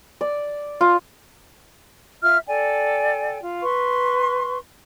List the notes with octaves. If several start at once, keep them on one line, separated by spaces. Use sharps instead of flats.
D5
F4
F4 E5 F6
A4 D5 G5 G#5
F4
B4 C6 C#6